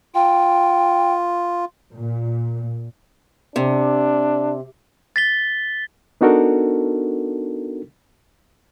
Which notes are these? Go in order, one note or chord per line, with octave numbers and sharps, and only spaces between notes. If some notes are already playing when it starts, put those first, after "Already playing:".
F4 G5
A#2
C3 D4
A6 B6 G7
B3 D4 D#4 F#4 A4 A#4